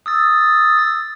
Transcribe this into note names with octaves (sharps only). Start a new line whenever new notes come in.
D#6 E6 A6